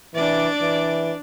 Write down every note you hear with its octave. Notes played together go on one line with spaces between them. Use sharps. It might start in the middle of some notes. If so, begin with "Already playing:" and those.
E3 D4 D5
E3